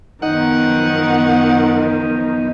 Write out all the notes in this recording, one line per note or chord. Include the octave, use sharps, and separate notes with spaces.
F#2 D#3 F3 B3 D#4 F#5